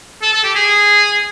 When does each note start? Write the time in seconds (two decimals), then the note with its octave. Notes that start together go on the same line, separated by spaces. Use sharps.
0.22 A4
0.33 A4
0.44 G4
0.55 G#4